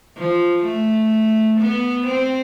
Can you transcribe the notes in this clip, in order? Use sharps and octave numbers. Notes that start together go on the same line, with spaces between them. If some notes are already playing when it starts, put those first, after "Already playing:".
F3
A3
B3
C4